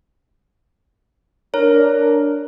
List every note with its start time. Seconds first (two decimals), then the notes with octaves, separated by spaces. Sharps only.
1.54 D4 A#4 C#5